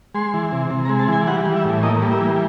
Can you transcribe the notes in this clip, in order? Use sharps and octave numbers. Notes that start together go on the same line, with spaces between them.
G#3 C6
E3
C3
C3
A#5
G#3
A5
E3 G#5
G3 F#5
E3
E5
A2
A#3 D#5
G3
E5
E3